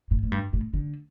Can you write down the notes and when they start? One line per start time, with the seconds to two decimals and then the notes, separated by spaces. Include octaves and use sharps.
0.11 A2
0.23 A2
0.32 G2
0.53 A2
0.74 D3